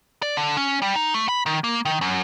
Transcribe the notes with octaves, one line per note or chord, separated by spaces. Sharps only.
D5
D3
C#4
G3
D#4
A3
B5
D#3
A#3
D#3
F#2